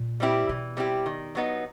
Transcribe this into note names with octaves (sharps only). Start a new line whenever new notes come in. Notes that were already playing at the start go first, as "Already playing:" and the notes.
Already playing: A#2
G3 C4 E4 G4
B2 E3
G3 C4 E4 G4
D#3
F#3 B3 D#4